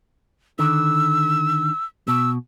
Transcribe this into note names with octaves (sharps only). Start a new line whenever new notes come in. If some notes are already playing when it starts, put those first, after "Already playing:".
D3 D#3 E6
B2 E6